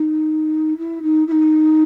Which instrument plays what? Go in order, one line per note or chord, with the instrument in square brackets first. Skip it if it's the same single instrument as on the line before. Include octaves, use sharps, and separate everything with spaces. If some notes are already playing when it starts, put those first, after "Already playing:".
Already playing: [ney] D#4
E4
D#4
E4
D#4